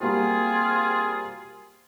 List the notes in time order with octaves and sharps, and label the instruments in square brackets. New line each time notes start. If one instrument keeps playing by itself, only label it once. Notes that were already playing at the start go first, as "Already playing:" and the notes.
[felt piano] G3 A#3 F#4 [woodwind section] C4 F4 G#4